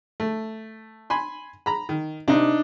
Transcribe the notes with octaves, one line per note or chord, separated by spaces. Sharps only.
A3
G#5 B5 C6
A#5 B5
D#3
C3 D4 D#4